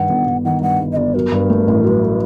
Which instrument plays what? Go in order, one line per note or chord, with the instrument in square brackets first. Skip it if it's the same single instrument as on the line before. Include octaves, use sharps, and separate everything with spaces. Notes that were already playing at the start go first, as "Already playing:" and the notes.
Already playing: [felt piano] G2 D#3 [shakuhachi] F#5
[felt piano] G1
G1
[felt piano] D#3 [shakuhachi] F#5
[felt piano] G2 [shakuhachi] F#5
[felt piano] G1
[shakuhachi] D#5
[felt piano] G1 [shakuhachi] D5
[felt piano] F#3 [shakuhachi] A#4
[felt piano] G2
A3
A1
F#3